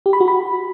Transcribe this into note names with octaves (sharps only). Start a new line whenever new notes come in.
G4
B5
F#4
B5